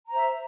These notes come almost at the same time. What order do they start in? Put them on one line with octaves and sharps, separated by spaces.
A#5 C5 E5